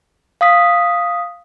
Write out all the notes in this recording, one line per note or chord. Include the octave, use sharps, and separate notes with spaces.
F5 D#6 B6